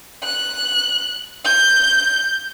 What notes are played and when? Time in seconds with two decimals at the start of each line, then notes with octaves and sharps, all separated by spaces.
0.24 F#6
1.45 G6